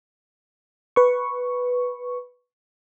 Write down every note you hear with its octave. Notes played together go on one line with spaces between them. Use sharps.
B4 C#6